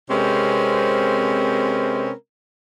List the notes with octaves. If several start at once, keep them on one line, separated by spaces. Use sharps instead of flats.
C3 G#3 C4 C#4 A#4 B4